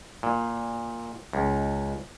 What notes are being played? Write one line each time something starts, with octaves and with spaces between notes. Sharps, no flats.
A#2
C#2